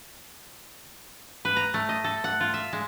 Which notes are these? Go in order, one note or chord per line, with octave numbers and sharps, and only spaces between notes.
B4
A#5
A3
D#5
A4
F#5
F4
E5
G#3